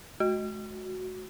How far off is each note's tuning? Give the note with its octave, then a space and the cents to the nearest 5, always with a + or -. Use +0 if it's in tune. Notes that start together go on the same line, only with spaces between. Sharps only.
G#3 +45 F#4 +0